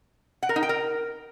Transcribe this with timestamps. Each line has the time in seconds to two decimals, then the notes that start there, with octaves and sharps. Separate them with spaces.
0.43 F#5
0.49 A#4
0.56 D#4
0.63 G5
0.69 A#4